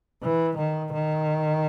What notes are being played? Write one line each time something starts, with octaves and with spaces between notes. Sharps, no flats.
E3
D#3
D#3